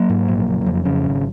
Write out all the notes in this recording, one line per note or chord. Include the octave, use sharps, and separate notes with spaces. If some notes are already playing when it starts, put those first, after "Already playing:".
Already playing: F#3 A#3
G#2
A#1
F#1
F2
C#3
G#1